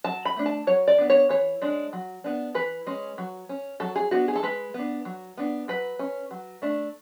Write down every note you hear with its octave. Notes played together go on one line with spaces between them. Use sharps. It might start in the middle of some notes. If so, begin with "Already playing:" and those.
F#3 A5
B5
A3 D4
A5
F#3 C#5
D5
B3 D4
C#5
E3 C#5
G#3 D4
F#3
B3 D4
E3 B4
G#3 C#4
F#3
C#4
F#3 A4
G#4
B3 D4 F#4
G#4
A4
G#3 B4
B3 D4
F#3
B3 D4
F#3 B4
C#4
F#3
A3 D4